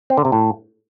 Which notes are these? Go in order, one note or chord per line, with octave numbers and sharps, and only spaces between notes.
C4
D3
C3
A2